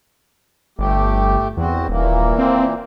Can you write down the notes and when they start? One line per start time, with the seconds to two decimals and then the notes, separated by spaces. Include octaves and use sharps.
0.79 G1 A3 G4
1.57 E2 C4 F#4
1.89 D#1 A#2 E3 A#3
2.38 C4